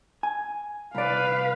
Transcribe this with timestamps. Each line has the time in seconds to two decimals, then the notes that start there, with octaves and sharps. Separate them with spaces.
0.23 G#5
0.95 C2 B4 D5 F5